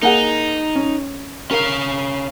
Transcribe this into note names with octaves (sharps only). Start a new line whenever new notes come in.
A#3 D#4 G#4 F#5
C#4
C#4 A#4 F5